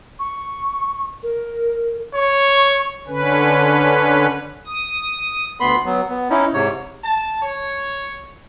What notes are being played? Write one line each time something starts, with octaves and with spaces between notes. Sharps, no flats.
C#6
A#4
C#5 C#6
D3 C#4 B4
D#6
D2 B3 B5 C6
F#3 B3
B3
C#4 D#4 E4
G#2 C3 C#5
A5
C#5